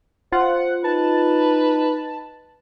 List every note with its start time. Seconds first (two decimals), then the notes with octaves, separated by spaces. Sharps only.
0.32 F4 C5 F#5
0.84 D#4 B4 A5